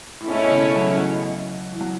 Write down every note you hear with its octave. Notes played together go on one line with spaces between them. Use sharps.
A2
G#2 A3 C#4 E4 A4 C#5
B2
C#3
F#3
E3
F#3
E3
F#3